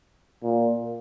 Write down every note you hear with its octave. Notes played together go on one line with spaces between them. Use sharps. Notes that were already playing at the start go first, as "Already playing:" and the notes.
A#2